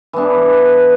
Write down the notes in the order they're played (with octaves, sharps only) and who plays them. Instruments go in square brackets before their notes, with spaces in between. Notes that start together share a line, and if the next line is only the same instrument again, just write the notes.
[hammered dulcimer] E3 B3 D4